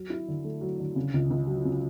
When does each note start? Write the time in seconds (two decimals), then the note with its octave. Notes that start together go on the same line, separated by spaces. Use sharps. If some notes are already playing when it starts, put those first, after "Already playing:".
Already playing: F#3
0.10 E4
0.28 D3
0.44 A3
0.61 F#3
0.79 D3
0.96 C#3
1.14 C#2
1.30 C#2
1.47 F#3
1.65 C#3